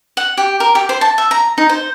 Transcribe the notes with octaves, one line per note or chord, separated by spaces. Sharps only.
F#5
G4
A#4
G4
C5
A5
E5
A#5
D#4
C5